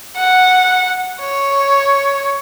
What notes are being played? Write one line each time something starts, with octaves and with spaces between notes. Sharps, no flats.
F#5
C#5